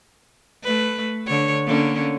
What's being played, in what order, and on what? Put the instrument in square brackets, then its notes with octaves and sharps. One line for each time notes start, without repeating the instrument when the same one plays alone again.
[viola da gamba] A3 B4
D3 C#5
D3 A#3 C#4